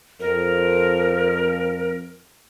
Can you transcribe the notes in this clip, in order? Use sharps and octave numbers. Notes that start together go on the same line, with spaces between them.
F2 A#4